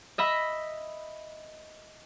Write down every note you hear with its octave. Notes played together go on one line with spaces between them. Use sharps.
D#5 E5 B5 A#6